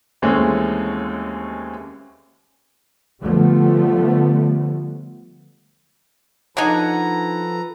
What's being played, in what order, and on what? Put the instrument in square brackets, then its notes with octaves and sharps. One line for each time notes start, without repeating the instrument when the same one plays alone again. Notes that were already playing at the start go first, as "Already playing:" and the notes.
[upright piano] D#2 E3 G#3 A3 C4 C#4
[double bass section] D3 F3 G3 A3 B3
[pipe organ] F3 A4 B4 [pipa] D4 D#4 [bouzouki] F#5 G#5 [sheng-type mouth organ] A#5